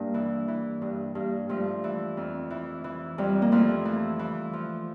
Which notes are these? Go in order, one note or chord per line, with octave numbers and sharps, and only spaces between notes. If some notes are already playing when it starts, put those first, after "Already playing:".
Already playing: G2 A#3 D4 G4 A#4
E3
E3
G2
G2 G3 A#3
G2 F3 A3
E3
F2
E3
E3
F2 G3
A#3
E3 F3 A3
E3
E3
F3